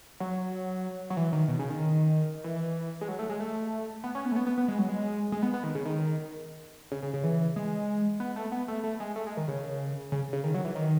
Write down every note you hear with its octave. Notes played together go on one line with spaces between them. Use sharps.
F#3
F#3
E3
D#3
B2
C#3
D#3
E3
G#3
F#3
A3
G#3
A3
B3
C#4
B3
A3
B3
B3
B3
G#3
F#3
G#3
G#3
B3
B3
D#3
C#3
D#3
C#3
C#3
C#3
E3
G#3
B3
A3
B3
A3
A3
G#3
A3
G#3
D#3
C#3
C#3
C#3
D#3
F#3
E3
D#3